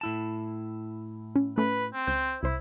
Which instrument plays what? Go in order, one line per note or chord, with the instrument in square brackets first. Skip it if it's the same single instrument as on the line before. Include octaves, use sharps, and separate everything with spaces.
[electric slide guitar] A2 E4 A5
[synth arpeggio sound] C#4
[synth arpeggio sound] A3 C#4 [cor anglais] B4
[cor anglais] C4
[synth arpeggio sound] C#2 [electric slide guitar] C5
[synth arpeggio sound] C2 C5 [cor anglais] E4